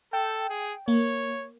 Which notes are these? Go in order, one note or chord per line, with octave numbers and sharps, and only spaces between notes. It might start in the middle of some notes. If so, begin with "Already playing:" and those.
A4 G5
G#4
A#3 C#5